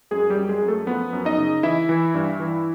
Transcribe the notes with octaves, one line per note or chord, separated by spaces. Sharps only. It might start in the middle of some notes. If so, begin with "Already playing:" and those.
F#2 G#3 G#4
G3 G4
F#2
G#3 G#4
F#2
A3 A4
F3 B3 B4
F#2
D#4 D#5
C#3
E3 E4 E5
E3
G2
E3